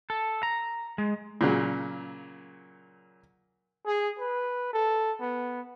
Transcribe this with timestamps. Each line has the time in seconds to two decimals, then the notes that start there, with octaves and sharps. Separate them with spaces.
0.10 A4
0.43 A#5
0.98 G#3
1.41 A#2 C#3 F#3
3.86 G#4
4.19 B4
4.73 A4
5.21 B3